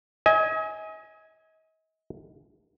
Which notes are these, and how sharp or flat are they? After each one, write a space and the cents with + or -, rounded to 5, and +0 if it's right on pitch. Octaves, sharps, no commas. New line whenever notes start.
D#5 +40 G#5 +0